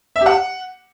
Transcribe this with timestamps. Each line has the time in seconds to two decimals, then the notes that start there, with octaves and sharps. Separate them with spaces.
0.16 E5
0.21 G4
0.26 F#5